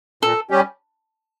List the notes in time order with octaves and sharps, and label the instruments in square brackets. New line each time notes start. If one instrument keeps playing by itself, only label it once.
[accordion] A#2 [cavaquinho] A4
[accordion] G3 C#4 G4